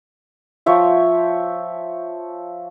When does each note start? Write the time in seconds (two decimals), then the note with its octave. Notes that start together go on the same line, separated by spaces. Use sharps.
0.66 F3 C#5 E5 G5